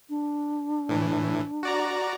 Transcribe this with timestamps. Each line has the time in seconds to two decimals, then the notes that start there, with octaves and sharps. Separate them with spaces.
0.10 D4
0.89 A2 E3
1.63 F#4 D5 A#5